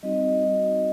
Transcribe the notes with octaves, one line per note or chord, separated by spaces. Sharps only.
G3 C4 D#4 F#4 D#5
G3 C4 D#4 F#4